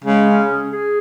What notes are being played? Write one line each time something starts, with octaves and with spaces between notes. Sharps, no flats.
C#3 G#3
C#4
G#4
G#4